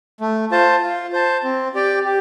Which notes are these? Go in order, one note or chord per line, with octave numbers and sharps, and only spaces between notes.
A3
F4 C5 A5
F4
C5 A5
C4
G4 D5 G5
G4